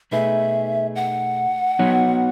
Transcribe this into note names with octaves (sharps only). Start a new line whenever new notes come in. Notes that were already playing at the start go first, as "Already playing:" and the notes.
B2 A3 D#4 G#4 B4 E5
F#5
F#3 B3 D#4 F#4 C#5